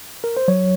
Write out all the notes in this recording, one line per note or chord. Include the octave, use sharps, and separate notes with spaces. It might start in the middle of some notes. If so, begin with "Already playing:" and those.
A#4
C5
F#3 C#5